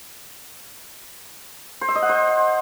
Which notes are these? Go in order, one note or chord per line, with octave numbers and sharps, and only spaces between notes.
C5
E5
D#5
F#5
C5